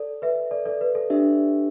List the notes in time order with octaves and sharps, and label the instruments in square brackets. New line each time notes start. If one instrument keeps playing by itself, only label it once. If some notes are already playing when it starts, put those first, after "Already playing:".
Already playing: [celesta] A4 D5
B4 E5
A4 D5
A4 D5
B4
A4
[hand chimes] D4 G4 E5